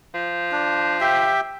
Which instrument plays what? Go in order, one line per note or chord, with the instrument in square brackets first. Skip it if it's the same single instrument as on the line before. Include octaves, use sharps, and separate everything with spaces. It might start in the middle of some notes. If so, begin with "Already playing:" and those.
[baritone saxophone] F3
[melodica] D4
G4 E5 G5